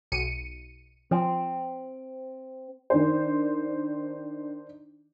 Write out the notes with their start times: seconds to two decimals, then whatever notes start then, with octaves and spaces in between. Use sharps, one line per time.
0.12 B1 C#7 D#7
1.11 F3 C4
2.90 D#3 D4 C5